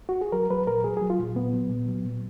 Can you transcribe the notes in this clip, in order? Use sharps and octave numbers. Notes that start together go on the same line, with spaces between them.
F#4
G#4
F#3 A#4
F#3 B4
A#2 A#4
F#3 G#4
G#4
F#3
F4
A#2
A#2 B3
F#3
A#2
F#3
A#2